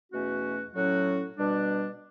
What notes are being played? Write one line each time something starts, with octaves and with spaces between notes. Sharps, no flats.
E2 B2 A3 C#4 F#4
A2 F#3 C#4 F#4
B2 G3 D4